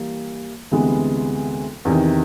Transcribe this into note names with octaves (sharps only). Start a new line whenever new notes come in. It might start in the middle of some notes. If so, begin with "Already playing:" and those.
Already playing: E3 G3 A#3
D2 C3 E3 G#3 B3
E2 C3 D#3